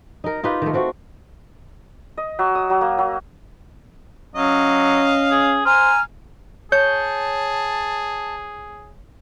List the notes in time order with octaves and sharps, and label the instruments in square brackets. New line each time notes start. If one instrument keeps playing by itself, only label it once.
[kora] D#4 A#4
D#4 F4 G4 B4
D#3 A3
A3 C4 F#4
[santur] D#5
F#3
D#6
F#3
A#3
F#3
[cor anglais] F#3 [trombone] C#4 [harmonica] D#5 F5
[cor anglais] G#4
[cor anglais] C5 [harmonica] G#5 A#5 [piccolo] F6
[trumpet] G#4 [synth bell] C#5 [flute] A5 [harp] G6